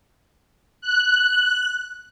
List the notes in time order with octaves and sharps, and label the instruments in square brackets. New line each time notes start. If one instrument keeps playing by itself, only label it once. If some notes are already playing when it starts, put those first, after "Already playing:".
[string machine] F#6